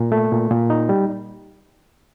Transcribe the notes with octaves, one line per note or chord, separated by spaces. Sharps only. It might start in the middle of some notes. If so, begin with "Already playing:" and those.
Already playing: A#2
A3
A#2
A#2
D#4
G3